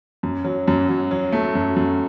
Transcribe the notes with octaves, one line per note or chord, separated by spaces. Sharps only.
F#2
F#3
F#2
F#3
F#3
A3
F#2
F#2